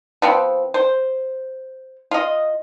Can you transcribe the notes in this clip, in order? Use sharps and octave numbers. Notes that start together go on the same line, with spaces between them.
F3 B3 C4
C5
F4 D#5